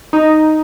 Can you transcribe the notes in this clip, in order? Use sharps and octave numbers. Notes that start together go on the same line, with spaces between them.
D#4